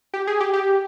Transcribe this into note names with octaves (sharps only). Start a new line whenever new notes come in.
G4
G#4
G4
G4